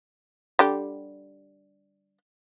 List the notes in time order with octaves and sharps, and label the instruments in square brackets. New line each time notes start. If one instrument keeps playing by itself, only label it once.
[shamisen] D3 G3 G4